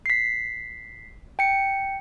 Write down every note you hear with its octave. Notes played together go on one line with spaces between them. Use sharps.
B6 C7
G5 C#7